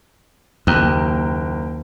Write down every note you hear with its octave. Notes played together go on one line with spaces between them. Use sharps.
F#1 D#2 G5 A#5